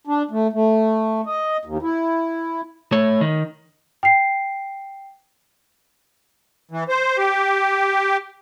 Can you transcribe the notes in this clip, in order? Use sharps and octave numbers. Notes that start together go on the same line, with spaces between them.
D4
A3
A3
D#5
D#2
E4
A3 C#5
D#3
G5 C7
E3
C5
G4